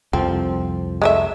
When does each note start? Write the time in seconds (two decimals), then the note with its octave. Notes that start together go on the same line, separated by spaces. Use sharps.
0.13 C2 F2 F3 C4
1.02 G#3 A3 E5